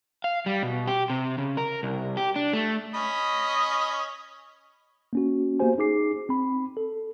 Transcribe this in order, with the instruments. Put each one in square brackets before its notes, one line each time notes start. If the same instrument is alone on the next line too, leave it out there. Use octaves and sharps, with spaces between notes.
[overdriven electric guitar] F5
G3
B2
G4
C3
C#3
A#4
C2
G4
D4
A3
[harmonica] C#4 D#5 B5
[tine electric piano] A#3 C#4 F#4
A#3 B3 F#4 G4 C5 G#5
D#4 G#4 D6 C7
C4 B5
A4